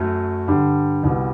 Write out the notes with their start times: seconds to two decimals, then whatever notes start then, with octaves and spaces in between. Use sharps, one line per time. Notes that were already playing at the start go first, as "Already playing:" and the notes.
Already playing: F#2 F#3 A3
0.48 G2 D3 G3
1.03 C2 B2 G3